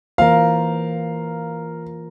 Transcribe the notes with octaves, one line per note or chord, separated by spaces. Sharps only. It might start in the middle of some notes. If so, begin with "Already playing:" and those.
E3 A#3 F4 A#4 C5 F5